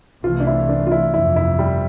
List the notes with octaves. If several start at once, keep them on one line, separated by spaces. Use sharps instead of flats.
C2 C3 E3 A3 F4
D4
E4
D4
F4
E4
G1 F2 C3 F3 E4
E4
G3